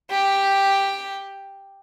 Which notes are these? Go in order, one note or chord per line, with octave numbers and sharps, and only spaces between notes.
G4